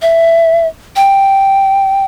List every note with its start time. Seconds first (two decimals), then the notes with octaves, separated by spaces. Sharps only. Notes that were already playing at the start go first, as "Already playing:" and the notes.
0.02 E5
0.96 G5